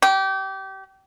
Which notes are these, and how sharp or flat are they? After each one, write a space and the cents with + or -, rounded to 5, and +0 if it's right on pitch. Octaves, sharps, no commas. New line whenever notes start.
G4 -25